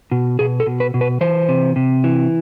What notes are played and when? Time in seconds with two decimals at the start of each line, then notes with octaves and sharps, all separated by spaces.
0.11 B2
0.39 B2 G#4
0.60 A4
0.66 B2
0.80 B4
0.94 B2
1.01 B4
1.21 E3 C5
1.49 C3
1.76 C3
2.04 E3